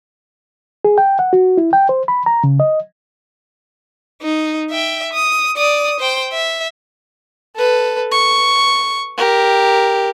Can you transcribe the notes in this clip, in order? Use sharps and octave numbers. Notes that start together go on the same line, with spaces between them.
G#4
G5
F#5
F#4
E4
G5
C5
B5
A#5
C#3
D#5
D#4
E5 G5
D#6
D5 D#6
C5 G5
E5
A4 B4
C#6
G4 A#4